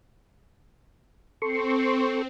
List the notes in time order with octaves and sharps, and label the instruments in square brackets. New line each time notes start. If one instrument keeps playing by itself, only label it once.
[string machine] C4 [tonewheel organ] A4 C6 C#6